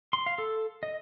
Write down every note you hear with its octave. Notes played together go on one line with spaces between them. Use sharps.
C6
F5
A4
D#5